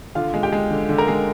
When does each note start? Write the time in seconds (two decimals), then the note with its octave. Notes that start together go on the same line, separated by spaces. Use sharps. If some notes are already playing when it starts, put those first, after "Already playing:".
0.15 D3 F4 F5
0.34 G#3
0.43 G4 G5
0.52 G#3
0.70 D3
0.89 D3
0.98 A#4 A#5
1.08 G#3